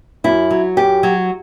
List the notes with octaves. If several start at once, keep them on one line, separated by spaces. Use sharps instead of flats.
F#2 E4
F#3
F#2 G4
F#3